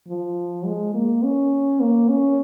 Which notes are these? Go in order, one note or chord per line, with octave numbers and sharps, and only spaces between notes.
F3
G#3
A#3
C#4
A#3
C#4